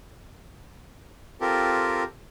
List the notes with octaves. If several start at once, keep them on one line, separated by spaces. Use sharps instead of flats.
C4 F4 G4 A4 A#4